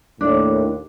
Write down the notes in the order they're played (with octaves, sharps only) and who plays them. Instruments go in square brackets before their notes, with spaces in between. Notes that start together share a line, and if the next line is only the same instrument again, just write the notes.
[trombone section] D#2 [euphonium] A2 [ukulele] D4